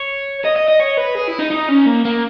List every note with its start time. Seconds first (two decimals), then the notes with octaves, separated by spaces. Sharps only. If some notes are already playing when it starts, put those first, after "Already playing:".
Already playing: C#5
0.45 D#5
0.56 D#5
0.68 D#5
0.80 C#5
0.98 B4
1.15 G#4
1.28 E4
1.39 D#4
1.51 D#4
1.69 C#4
1.87 A#3
2.05 A#3